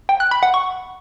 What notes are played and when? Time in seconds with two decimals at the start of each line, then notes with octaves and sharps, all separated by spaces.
0.09 G5
0.20 F#6
0.31 B5
0.43 F#5
0.54 C#6